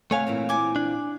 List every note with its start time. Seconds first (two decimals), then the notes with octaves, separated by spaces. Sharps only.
0.11 C3 A3 C#5 F5 F#5 G#5
0.27 A#2 E3 C4
0.49 G#5 D6
0.76 D4